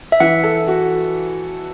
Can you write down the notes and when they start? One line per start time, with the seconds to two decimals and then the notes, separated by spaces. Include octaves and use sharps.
0.12 E5
0.20 E3 F#5
0.43 A4
0.68 F#4